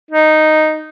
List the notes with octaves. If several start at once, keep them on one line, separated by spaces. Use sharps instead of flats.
D#4